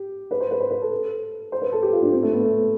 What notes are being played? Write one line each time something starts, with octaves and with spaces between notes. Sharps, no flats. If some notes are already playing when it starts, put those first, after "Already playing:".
Already playing: G4
B4
C5
B4
C5
B4
A4
C5
B4
A4
G4
F4
D4
C4
A3
B3
A3